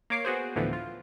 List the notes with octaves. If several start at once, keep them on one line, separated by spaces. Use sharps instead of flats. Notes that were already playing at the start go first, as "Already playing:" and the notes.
A#3 C#5 D6 C7
B3 F#4 G#4 C5
D2 A2 D3 E3 F3 B3
F4